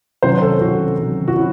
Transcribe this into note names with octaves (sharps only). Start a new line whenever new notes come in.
C3 D#3 F#3 C#4 C5
A4
C3 D#3 F#3 C#4 F#4
C3 D#3 F#3 C#4
F#4
F#3 C#4 E4